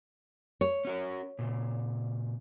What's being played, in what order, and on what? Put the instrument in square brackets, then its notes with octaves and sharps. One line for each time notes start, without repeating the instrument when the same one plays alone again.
[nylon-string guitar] C#5
[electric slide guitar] C#4 F#4 A#4
A#2 C#3